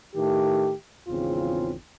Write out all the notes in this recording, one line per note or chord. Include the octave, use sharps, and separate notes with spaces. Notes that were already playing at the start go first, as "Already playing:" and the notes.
A2 D#3 A3 G4
G#1 E2 C#3 C4 F4